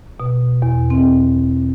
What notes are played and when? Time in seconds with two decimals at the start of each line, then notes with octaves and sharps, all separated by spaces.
0.20 B2
0.62 E2
0.90 C4